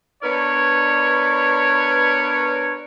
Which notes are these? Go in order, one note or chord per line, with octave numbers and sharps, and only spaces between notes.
B3 D4 A#4 B4 C#5